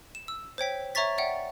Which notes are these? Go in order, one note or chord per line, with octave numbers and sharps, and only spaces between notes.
E7
E6
C5 C#5 G5 B6
C#5 E5 A#5 C#6 A6 B6
D5 E5 F#5 G5